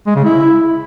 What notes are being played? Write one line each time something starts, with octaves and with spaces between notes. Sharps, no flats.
G#3
C#3
E4